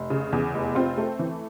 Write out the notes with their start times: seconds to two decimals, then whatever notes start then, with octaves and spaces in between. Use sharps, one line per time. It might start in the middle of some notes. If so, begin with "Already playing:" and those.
Already playing: F1
0.10 C#3
0.32 E2
0.54 F1
0.75 C4 F4
0.98 A3
1.19 E3